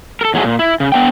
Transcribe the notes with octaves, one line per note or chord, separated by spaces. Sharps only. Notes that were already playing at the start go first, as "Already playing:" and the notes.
A4 A#4
E2 F#3 G#3 A3 G#4
A#2
E4
C#3
B3 D4 G5